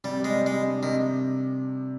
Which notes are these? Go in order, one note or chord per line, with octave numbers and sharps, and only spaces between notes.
C3 G3
G3
G#3
G3
C3 G#3
D4
C3 D#3